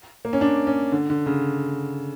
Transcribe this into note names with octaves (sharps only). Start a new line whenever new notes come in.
A#3
C#4
D4
C#4
D3
D3
C#3